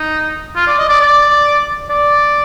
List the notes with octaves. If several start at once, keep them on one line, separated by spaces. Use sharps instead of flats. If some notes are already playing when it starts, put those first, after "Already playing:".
Already playing: D#4
F4
D5
D#5
D5
D5
D5